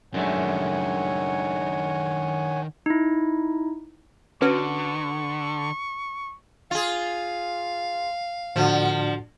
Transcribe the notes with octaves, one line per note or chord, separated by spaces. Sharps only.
F#2 D#3 G#3 A3 D4 C#5 F#5 G#5
D#4 E4
D3 C#4 F#4 B4 C#6
F4 G#4 F5
A2 D3 F3 F#4 F#5